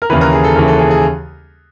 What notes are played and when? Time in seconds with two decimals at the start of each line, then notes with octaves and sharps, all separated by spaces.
0.02 A#4
0.10 D#2 C#3 E3 B4
0.21 A#4
0.33 G#4
0.44 A4
0.56 D#2 C#3 E3 A#4
0.68 A4
0.79 G#4
0.91 G#4